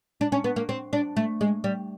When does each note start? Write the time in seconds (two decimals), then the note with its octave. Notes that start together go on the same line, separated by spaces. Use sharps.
0.21 D4
0.32 C#4
0.44 B3
0.56 A#3
0.69 C4
0.93 D4
1.17 A3
1.41 G#3
1.64 G3